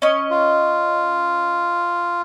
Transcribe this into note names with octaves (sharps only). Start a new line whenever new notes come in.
C#4 D#5
F4